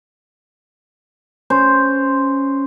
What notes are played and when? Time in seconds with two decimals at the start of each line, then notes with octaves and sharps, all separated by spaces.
1.50 C#4 C5